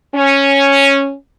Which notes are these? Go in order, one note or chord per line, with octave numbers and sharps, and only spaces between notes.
C#4